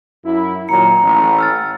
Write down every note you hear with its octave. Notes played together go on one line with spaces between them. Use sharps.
F#2 E4
A#2 D#3 F#3 A#5 C#7
A1
E6 F6 A6